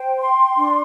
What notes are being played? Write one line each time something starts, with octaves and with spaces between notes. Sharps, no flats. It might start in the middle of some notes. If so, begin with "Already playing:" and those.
Already playing: C5 G5
C6
D4